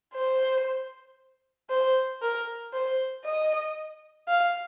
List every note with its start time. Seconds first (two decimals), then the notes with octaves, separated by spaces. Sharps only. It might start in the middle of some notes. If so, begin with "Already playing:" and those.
0.14 C5
1.69 C5
2.22 A#4
2.73 C5
3.25 D#5
4.28 F5